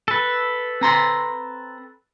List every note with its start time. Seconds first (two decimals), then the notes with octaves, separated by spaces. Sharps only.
0.08 A4 B4
0.81 C4 A#5 C6